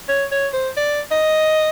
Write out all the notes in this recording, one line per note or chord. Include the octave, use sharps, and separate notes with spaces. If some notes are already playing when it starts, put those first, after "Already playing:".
C#5
C#5
C5
D5
D#5